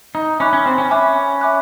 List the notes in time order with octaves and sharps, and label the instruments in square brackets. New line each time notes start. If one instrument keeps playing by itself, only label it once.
[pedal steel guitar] D#4
[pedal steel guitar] C#4 [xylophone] E5 G#5 B5 D6 F#6
[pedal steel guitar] C#4
C4
C#4
[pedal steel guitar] C#4 [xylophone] E5 G#5 B5 D6 F#6
[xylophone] E5 G#5 B5 D6 F#6